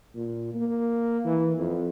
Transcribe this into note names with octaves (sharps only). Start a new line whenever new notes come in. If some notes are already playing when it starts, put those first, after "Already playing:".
A#2
A#3
E3
F2